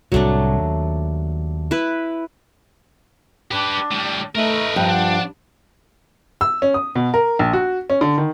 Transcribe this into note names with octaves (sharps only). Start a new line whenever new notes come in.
C2 A2 F#3 A3 D4
D#2
E4 B4
D4 G4 B4
A2 G3
A3 D#4 A#4 B4
G2 F3
D4 F#5
E6
C#4
D#6
B2
A#4
A#1
F#4
C#4
D3
D#3